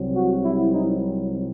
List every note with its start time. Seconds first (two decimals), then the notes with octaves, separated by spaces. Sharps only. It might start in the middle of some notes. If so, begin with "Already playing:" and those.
Already playing: C2 C3 F#3 C4
0.14 F#4
0.44 E4
0.74 D#4